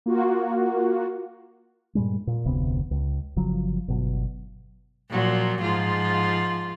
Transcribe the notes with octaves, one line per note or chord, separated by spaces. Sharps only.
A#3 F4 F#4
G2 A#2 G3 G#3
A#2
F1 D2 C3 B3
C#2
G1 C#3 F3 F#3
G1 B2 F#3
A#2 F3 F#3
G#2 F3 F4